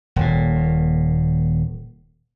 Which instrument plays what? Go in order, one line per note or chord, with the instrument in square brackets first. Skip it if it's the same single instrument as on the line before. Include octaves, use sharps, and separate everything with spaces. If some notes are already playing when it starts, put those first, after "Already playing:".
[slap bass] D#1 A#2